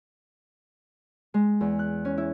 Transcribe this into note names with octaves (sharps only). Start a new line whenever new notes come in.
G#3
E2
F#6
C#4
E4